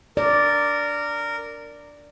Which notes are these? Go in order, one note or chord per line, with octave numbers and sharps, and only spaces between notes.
A#4 D5